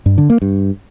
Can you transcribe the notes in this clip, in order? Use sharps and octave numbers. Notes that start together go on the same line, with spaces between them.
G2
D3
A#3
G2